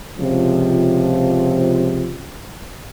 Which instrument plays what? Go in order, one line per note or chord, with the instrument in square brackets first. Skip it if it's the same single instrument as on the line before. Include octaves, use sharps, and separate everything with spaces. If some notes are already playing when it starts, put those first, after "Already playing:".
[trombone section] C#2 C3 F3